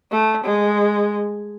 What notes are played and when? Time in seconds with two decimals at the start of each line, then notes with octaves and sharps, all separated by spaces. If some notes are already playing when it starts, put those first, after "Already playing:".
0.11 A3
0.45 G#3